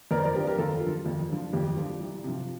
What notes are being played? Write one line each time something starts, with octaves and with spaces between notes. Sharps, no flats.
F2 A#4 D5
C5
A#4 D5
D3 F3 G4 A#4
G4 A#4
F2 F4 A4
D3 F3
F2
D3 F3
F2 G4
D3 F3
C2
C3 F3